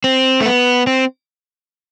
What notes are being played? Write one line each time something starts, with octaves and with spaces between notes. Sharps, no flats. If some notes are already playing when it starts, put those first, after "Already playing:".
C4
A3
B3
C4